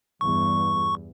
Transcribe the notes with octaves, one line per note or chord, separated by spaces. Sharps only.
E2 G2 C#6